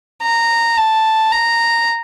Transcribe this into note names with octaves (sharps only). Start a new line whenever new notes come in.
A#5
A5
A#5